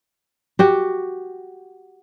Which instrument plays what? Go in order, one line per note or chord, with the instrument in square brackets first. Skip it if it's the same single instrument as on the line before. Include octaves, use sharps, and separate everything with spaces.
[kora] F#4 G4 G5